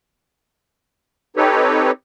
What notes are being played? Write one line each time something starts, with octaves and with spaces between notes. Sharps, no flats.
C4 D#4 G4 A4 B4 C#5